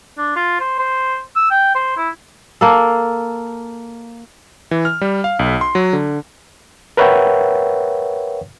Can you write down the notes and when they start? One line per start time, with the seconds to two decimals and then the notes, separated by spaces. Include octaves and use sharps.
0.18 D4
0.36 F4
0.60 C5
0.79 C5
1.36 E6
1.50 G5
1.75 C5
1.97 E4
2.61 A#3 A4
4.71 E3
4.85 F6
5.01 G3
5.24 F5
5.39 B1
5.61 C6
5.75 F#3
5.93 D3
6.97 A#4 B4 C#5 E5 F#5 G5